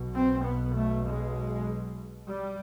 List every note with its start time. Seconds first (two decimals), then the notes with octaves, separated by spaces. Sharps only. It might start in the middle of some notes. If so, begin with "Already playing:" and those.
Already playing: B1 B2
0.14 C4
0.45 B3
0.75 A3
1.06 G#3
2.27 G3